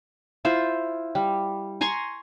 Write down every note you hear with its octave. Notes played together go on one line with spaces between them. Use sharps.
E4 F4 C5
G3
G#5 A#5 C6 C#6